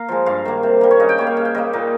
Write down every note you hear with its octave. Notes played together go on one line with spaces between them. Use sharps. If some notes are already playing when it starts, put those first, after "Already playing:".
Already playing: A#3 F5 A#5
F3 G#3
G2 F5
D#3 A#3
C3
G3 A#3
C#5
C#3 D#5
G5
G3 A#3 C#5
F5
C#3
G5
G3 A#3 D#5
A#2 D#4